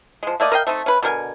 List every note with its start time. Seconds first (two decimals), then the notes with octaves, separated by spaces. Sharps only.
0.23 F3 G#3
0.40 A3 A#3 D5 D#5
0.52 A#4 D#5 F5 G5
0.67 A3 C4 D#4
0.86 C#4 B4
1.02 B2 D3 A#4 G#5